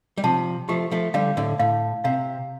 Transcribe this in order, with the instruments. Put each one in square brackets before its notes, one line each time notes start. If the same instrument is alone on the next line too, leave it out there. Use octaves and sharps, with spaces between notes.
[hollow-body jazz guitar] G3
[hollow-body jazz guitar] C3 F3 [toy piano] A5
[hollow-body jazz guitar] F3 A3 [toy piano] G4
[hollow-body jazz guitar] F3 A3
[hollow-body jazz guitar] D3 G3 [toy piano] F5
[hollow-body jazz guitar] A2 D3
[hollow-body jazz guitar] A2 [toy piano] F5
[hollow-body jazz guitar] C3 [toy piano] F5